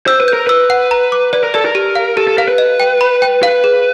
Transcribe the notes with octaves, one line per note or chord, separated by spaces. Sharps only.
C5 E6
B4
G6
A#4
B4 E6
F#5
A#5
D6
B4 D5
A#4
A4 D5
A#4
G4
F5
G4 A4
A4
A#4 F5
B4
D#5
G5
B5
G5
B4 F5
G#4